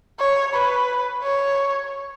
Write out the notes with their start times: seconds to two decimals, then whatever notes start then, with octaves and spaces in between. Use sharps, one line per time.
0.19 C#5
0.54 B4
1.23 C#5